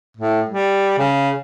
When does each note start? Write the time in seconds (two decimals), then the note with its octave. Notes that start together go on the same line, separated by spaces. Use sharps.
0.17 A2
0.49 G3
0.98 C#3